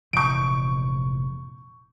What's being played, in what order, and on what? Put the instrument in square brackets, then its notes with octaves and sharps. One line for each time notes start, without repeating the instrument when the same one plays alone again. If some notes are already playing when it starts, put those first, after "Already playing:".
[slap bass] F1 A#2 E3 [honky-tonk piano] C#6 D7